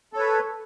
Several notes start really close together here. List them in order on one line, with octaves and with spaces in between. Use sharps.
A4 C#5 B4